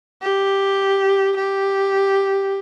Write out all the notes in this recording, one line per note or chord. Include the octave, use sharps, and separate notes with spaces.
G4
G4